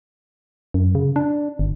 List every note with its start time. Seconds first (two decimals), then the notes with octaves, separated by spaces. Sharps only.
0.74 F#2
0.95 C#3
1.16 D4
1.59 G1